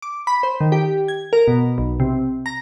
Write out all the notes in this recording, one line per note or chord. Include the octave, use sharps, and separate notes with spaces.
D6
B5
C5
D#3
G4
G#6
A#4
B2
B1
C3
A#5